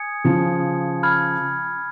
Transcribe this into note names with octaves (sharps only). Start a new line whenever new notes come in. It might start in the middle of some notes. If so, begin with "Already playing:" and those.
Already playing: G#5 D#6 G#6 C#7
C#3 F3
B5 F6 G#6